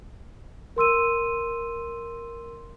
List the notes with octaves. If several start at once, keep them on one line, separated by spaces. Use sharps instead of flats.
A#4 C6 E6 D#7